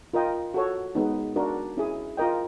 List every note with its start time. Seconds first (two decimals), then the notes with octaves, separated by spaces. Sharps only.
0.14 F4 A#4 D#5 G5
0.54 F#4 A4 C#5
0.95 G#3 B3 D#4
1.36 D4 F#4 A#4
1.77 C#4 E4 G#4
2.17 F4 A#4 D#5 G5